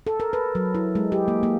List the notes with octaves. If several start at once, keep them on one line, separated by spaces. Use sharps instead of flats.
A4
A#4
B4
F#3
E4
G#3
G4
A#3
A#3